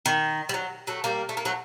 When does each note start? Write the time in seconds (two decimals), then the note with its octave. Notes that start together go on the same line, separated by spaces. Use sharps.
0.06 D#3
0.49 G3
0.54 F#3
0.87 F#3 A3
1.04 G3 A#3
1.29 A3
1.37 A#3
1.45 F#3 A3